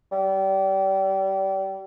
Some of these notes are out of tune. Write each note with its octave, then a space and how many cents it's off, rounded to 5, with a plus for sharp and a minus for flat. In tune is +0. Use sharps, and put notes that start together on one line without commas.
G3 -30